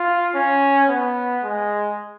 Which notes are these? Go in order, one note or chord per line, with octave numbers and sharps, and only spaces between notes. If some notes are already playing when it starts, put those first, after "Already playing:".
Already playing: F4
C#4
B3
G#3